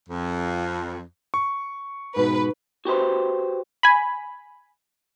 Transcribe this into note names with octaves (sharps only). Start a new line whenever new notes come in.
F2
C#6
G#2 B2 D#4 B4
F#4 G4 B4 C5
G#5 B5